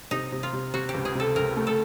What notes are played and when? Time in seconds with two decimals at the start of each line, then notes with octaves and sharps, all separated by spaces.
0.11 C3 D#4
0.32 C3
0.43 F4
0.53 C3
0.74 C3 F#4
0.89 G4
0.94 C#2
1.05 G#4
1.15 C3 A4
1.35 C#2 A#4
1.57 A3
1.67 A4